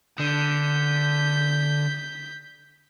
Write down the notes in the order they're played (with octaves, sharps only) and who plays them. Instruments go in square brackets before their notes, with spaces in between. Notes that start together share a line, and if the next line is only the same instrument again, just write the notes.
[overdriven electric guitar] D3 [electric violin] G6 B6